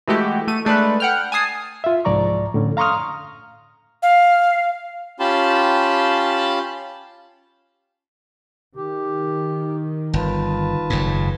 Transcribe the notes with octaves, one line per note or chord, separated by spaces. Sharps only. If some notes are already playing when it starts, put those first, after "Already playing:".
E3 G#3 A3 F#4 G4
A3 D#7
G#3 A3 D4 B4
F#5 G5 F6
G#5 A5 D#6 C7
F4 E5
C2 G#2 F3 D5 A#5 C#6
A2 D3 C#4
F5 A#5 C6 C#6 D#6 F6
F5
C#4 F4 G4 A5 B5 C6
D#3 G4
G1 F4 B4 A5
F#1 G#2